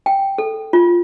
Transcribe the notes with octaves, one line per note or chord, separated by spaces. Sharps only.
G5
A4
F4